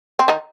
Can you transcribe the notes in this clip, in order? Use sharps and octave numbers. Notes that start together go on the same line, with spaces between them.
C4
D#3 D#4